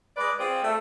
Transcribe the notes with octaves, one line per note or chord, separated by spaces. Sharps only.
G#3 B4 D5
C4 F4 G#4 C5 D5
A3